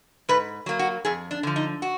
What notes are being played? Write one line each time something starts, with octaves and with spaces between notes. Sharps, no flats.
G#2 B4
F#3 A#3
F#4
F2 G#4
D4
D3 F3
D#4
F#4